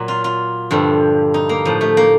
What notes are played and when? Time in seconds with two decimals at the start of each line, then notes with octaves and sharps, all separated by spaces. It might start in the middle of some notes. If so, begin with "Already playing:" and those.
Already playing: A#2 F#3
0.08 F4
0.24 F4
0.71 G2 D3 F3
1.34 D#4
1.49 A#3
1.65 A2 F3
1.81 A3
1.97 A#3